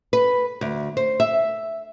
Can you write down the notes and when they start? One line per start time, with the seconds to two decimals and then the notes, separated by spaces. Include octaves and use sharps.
0.13 B4
0.61 D2
0.97 C5
1.20 E5